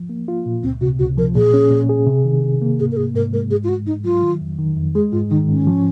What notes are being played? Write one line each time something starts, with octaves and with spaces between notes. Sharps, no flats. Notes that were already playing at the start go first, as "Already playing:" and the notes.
Already playing: F3
A#3
F4
A#2
C#2 C4
C3 F#4
C#2 F#4
F3 A#4
A#2 G#4
C#4
A#2
G#4
C3
D#3
C3
A#3
G#2 G#4
A#4
G#2 G#4
G#2 A#4
G#3 A#4
G#2 G#4
F4
G#2 F#4
G#2 D#4
F#3 F4
D#3
F2
D#3
F2
G#3 G#4
G#2 F4
D#3 D#4
G#2 C#4
F3